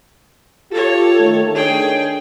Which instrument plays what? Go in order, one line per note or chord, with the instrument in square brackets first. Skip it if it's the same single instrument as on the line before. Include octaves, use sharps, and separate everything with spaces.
[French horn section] F4 G4 [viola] A4 C#5
[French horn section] D#3 A3
[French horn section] D#3 D4 C#5 [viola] G#4 G5